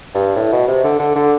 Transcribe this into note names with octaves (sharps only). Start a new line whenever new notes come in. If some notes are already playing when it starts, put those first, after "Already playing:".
G2
A2
B2
C3
D3
D3
D3